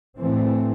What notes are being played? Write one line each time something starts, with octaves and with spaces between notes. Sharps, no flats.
A2 E3 A3 C4